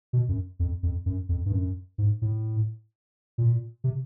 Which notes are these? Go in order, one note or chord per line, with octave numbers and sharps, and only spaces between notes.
B2
F#2
F2
F2
F#2
F2
G2
F#2
G#2
A2
A#2
C3